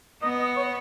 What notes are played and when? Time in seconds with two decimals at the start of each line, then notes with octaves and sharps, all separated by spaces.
0.22 B3 D#5
0.39 D#5
0.56 C#5